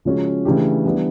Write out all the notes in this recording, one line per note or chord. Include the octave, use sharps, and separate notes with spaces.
C#3 F3 G#3 C#4 F#4
C#3 E3 A3 D4 G4
E3 G3 B3 D4